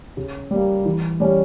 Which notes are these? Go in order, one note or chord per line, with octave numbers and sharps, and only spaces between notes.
C#3
G3
A#3
E3
G3 C#4